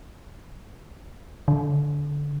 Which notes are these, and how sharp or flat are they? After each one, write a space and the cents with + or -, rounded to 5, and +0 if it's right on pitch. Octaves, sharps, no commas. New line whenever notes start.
D3 -15